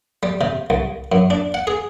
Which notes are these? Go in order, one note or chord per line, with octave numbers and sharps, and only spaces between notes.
G3
C3
C2
F#2
D4
F#5
G#4